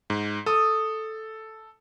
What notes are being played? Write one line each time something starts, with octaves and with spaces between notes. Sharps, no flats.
G#2
A4 D#6